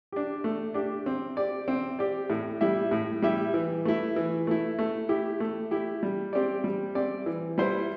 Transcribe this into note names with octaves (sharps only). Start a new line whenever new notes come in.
D4 G4
A3
D4 G4
C4
G4 D5
C4
G4 D5
A2
G3 E4 G4 E5
A2
G3 E4 G4 E5
E3
A3 E4
E3
A3 E4
A3
E4 G4
A3
E4 G4
G3
C4 G4 D5
G3
C4 G4 D5
E3
G3 E4 C5